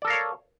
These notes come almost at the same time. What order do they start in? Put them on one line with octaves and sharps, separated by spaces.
D5 A4 A#4 F5 C#5